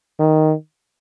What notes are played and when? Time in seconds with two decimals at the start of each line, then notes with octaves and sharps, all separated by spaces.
0.20 D#3